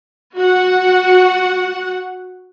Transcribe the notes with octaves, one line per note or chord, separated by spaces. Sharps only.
F#4 F#5